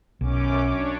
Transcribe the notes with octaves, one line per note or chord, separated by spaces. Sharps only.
B1 F#2 C#4 D6
D4 C#5